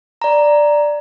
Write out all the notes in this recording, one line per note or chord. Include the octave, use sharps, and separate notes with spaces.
D5 A#5